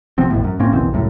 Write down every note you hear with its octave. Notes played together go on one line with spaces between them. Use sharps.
C3 F3 B3 C4
G#1 F2 A2
F#2
A2 A#3 C4 C#4
F#1 B1 E2 C4
C2 F#2 A2